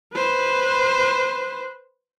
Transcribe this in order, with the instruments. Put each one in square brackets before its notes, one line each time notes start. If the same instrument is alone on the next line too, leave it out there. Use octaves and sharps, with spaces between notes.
[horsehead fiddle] B4 C5